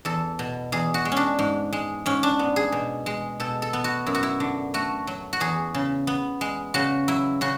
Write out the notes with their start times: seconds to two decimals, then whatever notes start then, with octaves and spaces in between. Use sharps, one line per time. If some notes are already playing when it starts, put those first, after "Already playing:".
0.05 E2 A4
0.39 B2
0.72 E2 G#4
0.94 F#4
1.05 G#3
1.12 C#4 D4
1.39 G#2
1.73 G#3
2.06 G#2 C#4
2.23 D4
2.39 B3
2.56 G#4
2.72 B2
3.06 G#3
3.40 B2 A4
3.62 A4
3.73 B3
3.84 F#4
4.06 F#2 E4
4.15 F#4
4.23 E4
4.40 D3
4.74 A3 F#4
5.07 F#3
5.33 F#4
5.40 E2 G#4
5.74 C#3
6.07 B3
6.41 G#3
6.74 C#3 F#4
7.08 F#3 E4
7.41 C#3 F#4